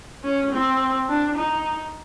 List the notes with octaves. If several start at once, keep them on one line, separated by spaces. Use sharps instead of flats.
C#4
C4
D4
D#4